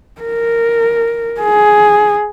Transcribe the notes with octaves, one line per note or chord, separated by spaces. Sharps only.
A#4
G#4